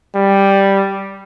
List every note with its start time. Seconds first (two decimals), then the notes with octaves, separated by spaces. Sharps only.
0.15 G3